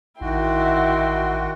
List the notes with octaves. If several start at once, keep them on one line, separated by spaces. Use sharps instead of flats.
A1 D#3 D#4 E4 F#4 F#5 G5 C6